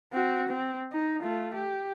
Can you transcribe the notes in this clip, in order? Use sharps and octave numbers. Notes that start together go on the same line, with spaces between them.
C4 F#4
C4
D#4
A3 F4
G4